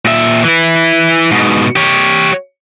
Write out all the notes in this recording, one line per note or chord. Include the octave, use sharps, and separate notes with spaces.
A#2 E5
E3 E4
G#2 B2
G4 C#5